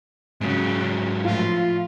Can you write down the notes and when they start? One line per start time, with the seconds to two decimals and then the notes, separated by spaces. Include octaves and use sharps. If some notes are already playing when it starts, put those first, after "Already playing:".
0.41 G#2 C#3 F#3
1.25 A2 F3 F4